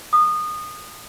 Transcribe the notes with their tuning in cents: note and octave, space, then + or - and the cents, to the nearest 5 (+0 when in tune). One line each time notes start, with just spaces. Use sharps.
D#6 -25